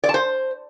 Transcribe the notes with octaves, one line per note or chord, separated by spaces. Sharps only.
D5
A5
C5